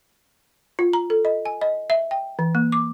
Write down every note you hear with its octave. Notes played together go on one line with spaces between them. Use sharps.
F4
A#5
A4
D#5
G#5
D#5
E5
G5
E3
A#3
D6